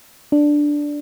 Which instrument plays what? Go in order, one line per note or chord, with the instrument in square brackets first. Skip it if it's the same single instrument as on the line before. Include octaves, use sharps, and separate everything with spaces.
[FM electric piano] D4